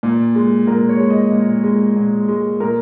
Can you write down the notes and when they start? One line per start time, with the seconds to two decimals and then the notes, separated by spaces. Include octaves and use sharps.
0.03 A#2
0.35 G#3
0.67 A#2 A#4
0.89 C#5
1.00 G#3
1.10 D#5
1.32 A#2
1.63 G#3
1.96 A#2
2.28 G#3
2.60 A#2 A#4